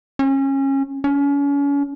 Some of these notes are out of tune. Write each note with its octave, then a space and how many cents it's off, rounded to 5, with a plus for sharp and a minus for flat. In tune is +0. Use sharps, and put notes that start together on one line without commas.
C#4 -25
C#4 +35